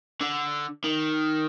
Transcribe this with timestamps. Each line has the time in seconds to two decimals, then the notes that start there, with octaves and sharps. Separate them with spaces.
0.21 D3
0.84 D#3